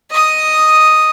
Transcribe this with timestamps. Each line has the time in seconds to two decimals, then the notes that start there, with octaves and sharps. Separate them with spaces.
0.10 D#5 D#6